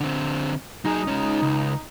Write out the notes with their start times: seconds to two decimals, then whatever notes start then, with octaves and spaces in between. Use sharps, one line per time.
0.01 D3 C4
0.85 F#3 D#4 G#4
1.07 G#3 C#4
1.42 C#2